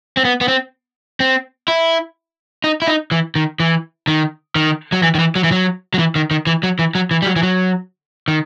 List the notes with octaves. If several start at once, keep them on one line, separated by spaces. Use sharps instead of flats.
C4
B3
B3
C4
C4
E4
D#4
E4
D#4
E3
D#3
E3
D#3
D#3
F#3
E3
D#3
E3
F#3
E3
F#3
F#3
E3
D#3
D#3
E3
F#3
E3
F#3
E3
G3
F#3
E3
F#3
D#3